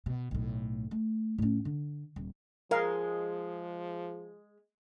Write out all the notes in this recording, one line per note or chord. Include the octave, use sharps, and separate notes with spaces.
B2
B1 A2
A3
A2 C#4
D3
D#1
F3 G#3 A#4 F5